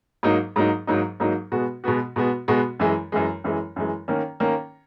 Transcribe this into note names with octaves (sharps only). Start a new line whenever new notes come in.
G#2 F#3 A#3 D#4
G#2 F#3 A#3 D#4
G#2 F#3 A#3 D#4
G#2 F#3 A#3 D#4
B2 G#3 B3 F#4
B2 G#3 B3 F#4
B2 G#3 B3 F#4
B2 G#3 B3 F#4
F#2 E3 G#3
F#2 E3 G#3
F#2 E3 G#3
F#2 E3 G#3
D#3 A#3 C#4
D#3 A#3 C#4